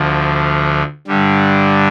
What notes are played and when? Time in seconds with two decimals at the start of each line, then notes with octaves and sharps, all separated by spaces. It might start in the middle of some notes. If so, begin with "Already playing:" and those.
Already playing: D2 D3 F3
1.07 G2 D3 G3